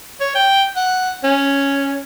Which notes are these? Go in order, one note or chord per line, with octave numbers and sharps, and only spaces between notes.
C#5
G5
F#5
C#4